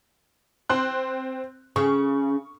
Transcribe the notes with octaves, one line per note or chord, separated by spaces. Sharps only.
C4 C6 F#6
C#3 C#6